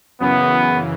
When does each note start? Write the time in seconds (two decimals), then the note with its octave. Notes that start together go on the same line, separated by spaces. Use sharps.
0.20 F#2 C#3 E3 B3